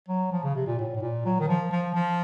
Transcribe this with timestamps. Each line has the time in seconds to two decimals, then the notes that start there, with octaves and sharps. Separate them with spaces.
0.09 F#3
0.33 F3
0.44 C#3
0.55 C3
0.67 A#2
0.79 A2
0.95 A2
1.02 A#2
1.25 F#3
1.40 D#3
1.48 F3
1.71 F3
1.94 F3